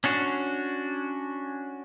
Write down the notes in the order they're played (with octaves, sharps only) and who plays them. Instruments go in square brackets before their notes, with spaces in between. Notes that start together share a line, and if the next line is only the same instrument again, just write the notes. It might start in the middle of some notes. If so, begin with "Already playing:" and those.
[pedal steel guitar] C#4 D4 F#4